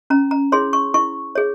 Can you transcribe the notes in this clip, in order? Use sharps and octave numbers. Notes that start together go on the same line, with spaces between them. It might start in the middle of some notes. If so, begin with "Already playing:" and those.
C#4 A#5
A#5
E4 G#4 C#5 C6
C#6
E4 C#6
G#4 C#5